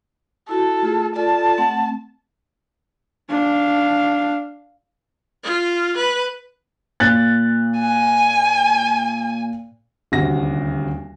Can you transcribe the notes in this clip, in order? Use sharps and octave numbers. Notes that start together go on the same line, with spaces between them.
E4 F#4 A4
A3 F4 G#4
F4 A4 D5 A5
A3 C4 F#5
D4 F5
F4
B4
A#2 F#6 A6
G#5
D#1 D2 C3 F#4 A#6